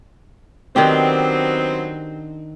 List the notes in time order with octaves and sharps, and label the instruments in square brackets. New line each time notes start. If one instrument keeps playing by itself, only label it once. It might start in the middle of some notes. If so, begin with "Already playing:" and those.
[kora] D#3 D4 G4 [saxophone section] F#3 B3 C4